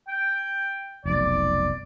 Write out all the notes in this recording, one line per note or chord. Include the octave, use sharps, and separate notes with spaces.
G5
F1 B1 D5